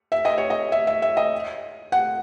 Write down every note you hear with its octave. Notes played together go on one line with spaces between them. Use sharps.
E5
D#5
C#5
D#5
E5
E5
E5
D#5
F#5